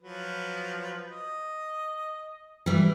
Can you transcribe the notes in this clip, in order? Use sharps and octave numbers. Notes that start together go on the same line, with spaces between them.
F3 F#3 B4
D#5
E3 G3